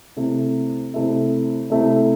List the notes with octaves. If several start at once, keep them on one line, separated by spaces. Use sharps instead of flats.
C3 A3 E4
C3 A3 E4
C3 A3 E4